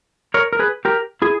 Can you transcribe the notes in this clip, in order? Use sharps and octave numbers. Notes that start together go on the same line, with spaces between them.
A#4 C#5
A#4
G#4 B4
G4 A#4
E4 G#4